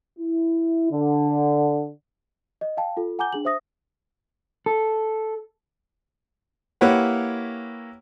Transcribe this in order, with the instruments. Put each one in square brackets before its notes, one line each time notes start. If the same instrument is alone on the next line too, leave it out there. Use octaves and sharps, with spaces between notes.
[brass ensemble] E4
D3
[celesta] D#5
F5 G5 A5
F4 A4
F#5 G#5 A#5 D6 G6 G7
D4 G#4 F#7
C5 E5 D#6 A#6
[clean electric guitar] A4
[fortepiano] A#3 E4 G4 B4 C#5 F#5